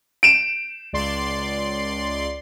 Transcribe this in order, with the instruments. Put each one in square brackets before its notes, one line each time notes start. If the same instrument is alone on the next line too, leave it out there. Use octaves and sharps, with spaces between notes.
[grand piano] D7 E7
[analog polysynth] C#2 D5 C6